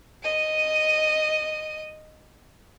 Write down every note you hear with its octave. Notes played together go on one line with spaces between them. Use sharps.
D#5 D#7